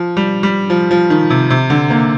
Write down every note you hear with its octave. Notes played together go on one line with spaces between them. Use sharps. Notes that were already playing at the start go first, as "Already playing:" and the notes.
Already playing: F3
G3
G3
F3
F3
D#3
C3
C3
D3
A#3